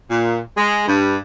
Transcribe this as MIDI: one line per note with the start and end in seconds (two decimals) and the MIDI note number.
0.10 0.38 46
0.56 0.84 56
0.87 1.16 43